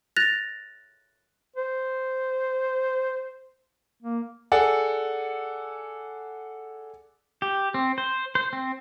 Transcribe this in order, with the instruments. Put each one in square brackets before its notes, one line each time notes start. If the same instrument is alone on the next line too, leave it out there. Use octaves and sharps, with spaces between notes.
[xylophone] F#6 A6 A#6 F7
[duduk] C5
A#3
[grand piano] G#4 A4 D5 F#5 G#5
[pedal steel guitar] G4
C4
C5
C5
C4